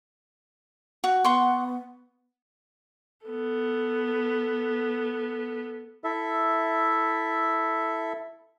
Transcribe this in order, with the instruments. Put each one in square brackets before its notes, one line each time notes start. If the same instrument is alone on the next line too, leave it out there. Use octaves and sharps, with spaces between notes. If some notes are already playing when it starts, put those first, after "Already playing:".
[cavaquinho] F#4
[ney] B3 [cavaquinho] F#5 C6 C#6
[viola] B3 A4
[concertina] E4 A4 E5